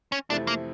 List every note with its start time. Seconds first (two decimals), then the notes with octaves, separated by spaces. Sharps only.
0.12 C#4
0.30 F2 C3 E3 A3 C4 D4
0.47 A#3